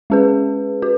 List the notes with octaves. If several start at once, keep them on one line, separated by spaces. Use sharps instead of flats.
G#3 C#4 G#4 B4
F#4 B4